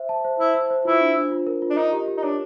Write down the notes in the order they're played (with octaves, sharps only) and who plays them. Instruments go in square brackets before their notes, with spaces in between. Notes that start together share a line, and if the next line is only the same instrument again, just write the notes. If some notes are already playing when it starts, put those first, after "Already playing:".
Already playing: [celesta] C5 E5
A5
C5
[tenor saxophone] E4 [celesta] C5
[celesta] C5
C5
[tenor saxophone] E4 [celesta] F4
[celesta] D4
D4
F4
A#4
F4
[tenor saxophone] D4
[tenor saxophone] D#4 [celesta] A#4
[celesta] G4
G4
[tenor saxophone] D#4
[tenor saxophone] D4 [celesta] C#5